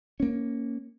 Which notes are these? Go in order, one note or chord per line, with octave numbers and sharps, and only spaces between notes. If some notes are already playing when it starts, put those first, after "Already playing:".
A#3 C#4